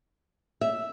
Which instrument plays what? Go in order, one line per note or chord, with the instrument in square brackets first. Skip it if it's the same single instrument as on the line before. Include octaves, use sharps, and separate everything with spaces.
[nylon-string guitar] E5